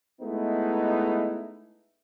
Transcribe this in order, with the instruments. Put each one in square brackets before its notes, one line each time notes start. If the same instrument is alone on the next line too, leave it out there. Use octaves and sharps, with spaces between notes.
[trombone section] G#3 A3 B3 D#4 E4